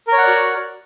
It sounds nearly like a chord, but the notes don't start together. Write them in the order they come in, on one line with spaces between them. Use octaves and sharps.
A#4 C#5 F#5 D5 F#4